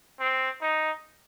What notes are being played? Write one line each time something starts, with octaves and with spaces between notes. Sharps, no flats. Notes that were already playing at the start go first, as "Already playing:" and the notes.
C4
D#4